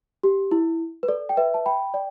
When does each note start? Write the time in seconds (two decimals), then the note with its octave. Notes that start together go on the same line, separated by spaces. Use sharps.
0.23 G4
0.51 E4
1.03 B4
1.08 A4 D5
1.29 G5
1.37 B4 E5
1.54 A5
1.66 G5 B5
1.94 D5 G5